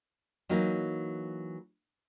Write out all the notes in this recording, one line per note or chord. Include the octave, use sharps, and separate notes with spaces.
E3 F#3 A#3 D#4